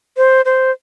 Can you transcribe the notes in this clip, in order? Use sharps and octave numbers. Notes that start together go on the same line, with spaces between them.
C5
C5